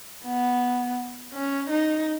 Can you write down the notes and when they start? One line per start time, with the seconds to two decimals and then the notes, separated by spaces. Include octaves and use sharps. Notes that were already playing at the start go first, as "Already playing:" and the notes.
0.25 B3
1.34 C#4
1.70 D#4